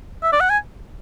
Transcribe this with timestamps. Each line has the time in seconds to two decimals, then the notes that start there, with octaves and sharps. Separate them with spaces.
0.23 E5
0.32 D5
0.41 F#5
0.50 G#5